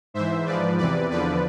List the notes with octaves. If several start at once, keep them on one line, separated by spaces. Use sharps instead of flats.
G#2 E3 C5 E5
G#2 F3 B4 D5
E2 C3 E3 B4 D5
E2 D3 F3 B4 D5